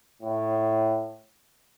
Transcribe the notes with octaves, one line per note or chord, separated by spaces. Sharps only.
A2